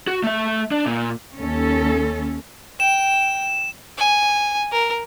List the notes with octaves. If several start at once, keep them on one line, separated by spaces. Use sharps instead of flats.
F#4
A3 E5
D4
A#2
D#2 C#4 A4
G5 E7
G#5
A#4